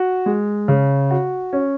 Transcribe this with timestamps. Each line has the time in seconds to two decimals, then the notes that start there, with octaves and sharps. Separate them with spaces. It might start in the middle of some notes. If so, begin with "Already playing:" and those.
Already playing: F#4
0.26 G#3
0.68 C#3
1.11 F#4
1.53 C#4